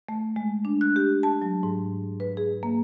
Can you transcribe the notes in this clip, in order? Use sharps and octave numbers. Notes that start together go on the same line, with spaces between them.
A3
G#3
D4
F#6
G4
A5
F#3
G#2
B4
G#4
A#3